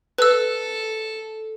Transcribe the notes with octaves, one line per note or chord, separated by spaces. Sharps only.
A4 B4 E6